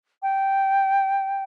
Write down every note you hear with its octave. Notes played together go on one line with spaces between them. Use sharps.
G5